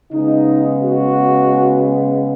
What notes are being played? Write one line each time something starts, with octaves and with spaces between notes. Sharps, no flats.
C#3 G#3 B3 D#4
F#4